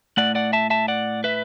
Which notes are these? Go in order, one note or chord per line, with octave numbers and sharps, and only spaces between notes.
A2 A3 D5 F#5
D5 F#5
E5 A5
E5 A5
D5 F#5
B4 E5